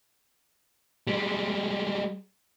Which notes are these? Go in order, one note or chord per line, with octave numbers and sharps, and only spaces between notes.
G3 G#3